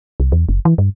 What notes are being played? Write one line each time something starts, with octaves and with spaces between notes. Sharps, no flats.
C2
E2
F#1
E3
G2